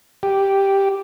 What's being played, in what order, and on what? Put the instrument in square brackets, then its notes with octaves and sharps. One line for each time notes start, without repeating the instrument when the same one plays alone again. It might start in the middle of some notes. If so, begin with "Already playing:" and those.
[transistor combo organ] G4